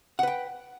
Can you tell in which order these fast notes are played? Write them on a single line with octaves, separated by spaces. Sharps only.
F#5 B4 G5